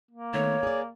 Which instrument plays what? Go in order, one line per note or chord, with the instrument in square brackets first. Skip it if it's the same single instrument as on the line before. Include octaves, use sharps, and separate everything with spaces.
[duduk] A#3
[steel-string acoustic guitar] D#3 A3 B3 [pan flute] C#5
[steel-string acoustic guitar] G#4 D5